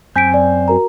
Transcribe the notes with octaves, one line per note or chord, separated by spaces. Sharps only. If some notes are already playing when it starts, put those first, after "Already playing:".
F#2 C4 G#5 G6 B6 D7
D5
F#4 A#4 A#5